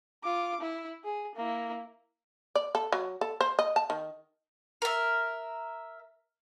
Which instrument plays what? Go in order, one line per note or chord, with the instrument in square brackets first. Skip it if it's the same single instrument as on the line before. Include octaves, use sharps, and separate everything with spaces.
[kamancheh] F4 D6
E4
G#4
A#3 E4
[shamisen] D5
A4
F#3
A4
C5
D#5
A5
D#3
[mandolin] A#4 E5